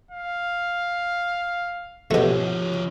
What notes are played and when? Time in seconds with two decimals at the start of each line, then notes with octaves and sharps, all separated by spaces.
0.11 F5
2.11 B2 F3 A3 C#4 F#4 G4